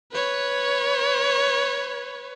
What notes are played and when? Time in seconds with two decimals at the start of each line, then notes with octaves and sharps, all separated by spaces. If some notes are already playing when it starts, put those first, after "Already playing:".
0.13 B4 C#5